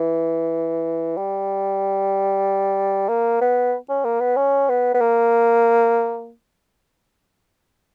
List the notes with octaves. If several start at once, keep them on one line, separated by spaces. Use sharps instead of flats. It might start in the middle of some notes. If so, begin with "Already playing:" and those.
Already playing: E3
G3
A#3
B3
C#4
A#3
B3
C#4
B3
B3
A#3